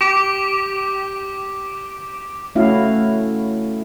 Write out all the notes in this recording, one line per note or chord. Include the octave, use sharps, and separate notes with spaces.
G4 D6
A3 C#4 E4 F#4 F5